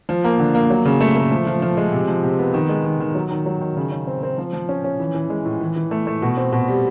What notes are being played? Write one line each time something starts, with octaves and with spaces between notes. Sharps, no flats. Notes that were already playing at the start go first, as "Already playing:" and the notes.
F3
A#3
D3
A#3
F#3
C#3
A3
A3
F3
F3
F3
G#3
C3
F3
C3
B3
D#3
G#3
D#3
D#3
F#3
D#3
F#3
D#3
C#3
C#3
C4
C4
F3
F3
C#4
C#4
E3
E3
G#3
A2
E3
E3
A3
A3
B2
C4
B2
G3